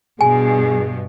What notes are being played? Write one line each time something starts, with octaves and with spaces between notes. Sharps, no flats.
G2 B2 G#4 G#5